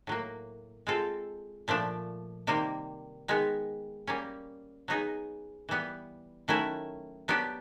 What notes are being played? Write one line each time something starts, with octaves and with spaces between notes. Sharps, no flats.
A2 F#3 A#3
G#3 C4 F4 A4
A#2 F3 A3 D4
C3 D#3 G3 A#3
D#3 G#3 B3
G3 A#3 C#4
F#3 B3 D#4 G#4
E3 G3 B3
D#3 F#3 A3 C#4 E4
F#3 B3 D4 G4